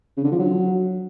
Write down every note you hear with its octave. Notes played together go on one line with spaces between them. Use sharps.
C#3
D3
F3
F#3